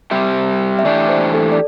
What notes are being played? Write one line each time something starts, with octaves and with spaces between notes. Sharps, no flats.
G3 C4 G4 E5
E5
E3 A3 D4 G4 D5
C5
A4
D5